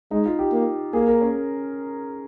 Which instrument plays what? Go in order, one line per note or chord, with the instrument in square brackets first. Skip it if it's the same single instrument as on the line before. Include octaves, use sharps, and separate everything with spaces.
[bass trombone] G#3 [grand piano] D#4
[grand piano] F4
G4
[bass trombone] A#3
[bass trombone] A#3 [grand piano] G#4
[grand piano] A#4
C#4